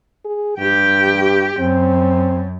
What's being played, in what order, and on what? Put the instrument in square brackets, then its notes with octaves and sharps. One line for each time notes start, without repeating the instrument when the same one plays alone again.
[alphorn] G#4
[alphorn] G2 [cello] G4 G5
[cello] F#2 [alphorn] C4